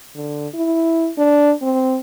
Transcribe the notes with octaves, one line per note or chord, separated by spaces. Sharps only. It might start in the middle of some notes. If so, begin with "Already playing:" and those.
D3
E4
D4
C4